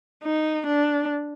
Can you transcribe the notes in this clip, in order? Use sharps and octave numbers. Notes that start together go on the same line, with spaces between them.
D#4
D4